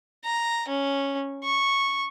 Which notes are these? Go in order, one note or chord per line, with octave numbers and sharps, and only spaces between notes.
A#5
C#4
C#6